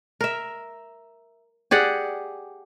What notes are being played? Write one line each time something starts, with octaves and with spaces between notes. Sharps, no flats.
A#4 E5
G4 G#4 D5 F#5